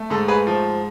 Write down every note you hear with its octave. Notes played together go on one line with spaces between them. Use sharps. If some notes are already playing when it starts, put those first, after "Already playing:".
Already playing: A3
G#2 A4
G#4 B4
F3